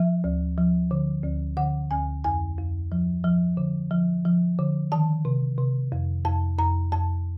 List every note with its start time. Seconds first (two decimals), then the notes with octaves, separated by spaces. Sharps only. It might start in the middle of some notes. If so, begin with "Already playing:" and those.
Already playing: F3 E5
0.24 D2
0.58 F3
0.91 D3
1.24 D2
1.57 D3 F#5
1.91 D2 G#5
2.24 F2 G#5
2.58 F2
2.92 F3
3.24 F3
3.57 D3
3.91 F3
4.25 F3
4.59 D3
4.92 D#3 A5
5.25 C3
5.58 C3
5.92 F2
6.25 F2 A5
6.58 F2 A#5
6.92 F2 A5